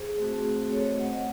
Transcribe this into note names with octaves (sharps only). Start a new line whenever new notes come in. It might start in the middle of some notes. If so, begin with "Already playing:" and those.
Already playing: G#4 C5
A3 C4 F#4
A4 C#5
C5 D#5
D#5 F#5
D#5 F#5